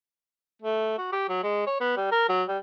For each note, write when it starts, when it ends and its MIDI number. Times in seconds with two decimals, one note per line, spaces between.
0.62 0.96 57
0.98 1.09 66
1.12 1.25 67
1.29 1.40 54
1.44 1.66 56
1.67 1.79 73
1.80 1.96 59
1.97 2.09 55
2.12 2.24 70
2.29 2.44 54
2.48 2.58 55